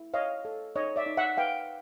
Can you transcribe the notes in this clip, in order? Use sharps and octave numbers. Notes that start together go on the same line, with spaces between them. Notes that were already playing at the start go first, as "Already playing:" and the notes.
Already playing: E4
C#5 D#5 F5
A4
D#4 C#5 D#5
D5 E5
D#4
E5 F#5
B4 F5 G5